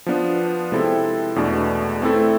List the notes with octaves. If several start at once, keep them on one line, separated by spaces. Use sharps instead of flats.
F3 B3 D4 F4 B4
C3 G#3 C4 E4 A4
E2 B2 A3 D4
A3 C4 E4 A4